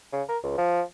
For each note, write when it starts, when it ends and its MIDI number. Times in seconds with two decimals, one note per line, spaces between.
0.13 0.23 49
0.29 0.38 70
0.44 0.55 37
0.58 0.82 53